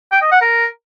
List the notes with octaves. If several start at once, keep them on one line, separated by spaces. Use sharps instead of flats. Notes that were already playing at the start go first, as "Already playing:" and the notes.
G5
D#5
F#5
A#4